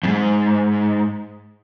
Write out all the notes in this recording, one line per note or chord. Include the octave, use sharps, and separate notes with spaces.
F2 G#2